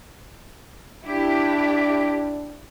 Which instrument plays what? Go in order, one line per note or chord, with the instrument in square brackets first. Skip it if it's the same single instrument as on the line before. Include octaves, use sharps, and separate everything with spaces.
[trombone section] D4 [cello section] E4 G4